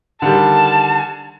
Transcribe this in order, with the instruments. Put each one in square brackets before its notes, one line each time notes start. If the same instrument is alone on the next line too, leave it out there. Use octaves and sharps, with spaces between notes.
[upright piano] D3 D#3 G3 [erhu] A5